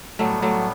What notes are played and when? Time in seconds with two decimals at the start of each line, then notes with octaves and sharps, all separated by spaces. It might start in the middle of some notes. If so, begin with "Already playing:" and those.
0.19 A2 F#3 G3 A3 B3
0.42 F#3 A3